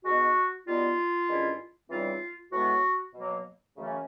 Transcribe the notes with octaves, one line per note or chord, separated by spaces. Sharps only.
B2 G#3 B3 D#4 F#4
B2 G3 B3 D#4 F4
G2 D#3 G#3 C#4 E4
C#3 E3 G3 C4 D#4 F4
A2 E3 G#3 B3 F#4
B2 F#3 A#3
F#2 C#3 E3 A3 C#4